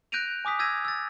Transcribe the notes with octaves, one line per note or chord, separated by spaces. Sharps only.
F#6 G6 A#6 D7 D#7 F7
G#5 D6 D#6 B6
E6 G6 G#6 A#6 D#7
E6 A6